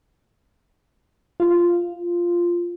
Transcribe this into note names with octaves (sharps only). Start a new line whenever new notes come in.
F4